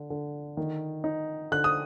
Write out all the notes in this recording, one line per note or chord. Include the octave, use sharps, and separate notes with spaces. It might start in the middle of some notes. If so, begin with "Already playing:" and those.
Already playing: D3
D3
D#3
D#4
D3 F#6
D#6